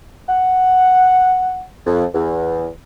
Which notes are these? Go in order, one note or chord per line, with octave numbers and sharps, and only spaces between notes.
F#5
F2
E2